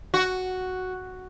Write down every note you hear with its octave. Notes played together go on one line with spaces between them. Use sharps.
F#4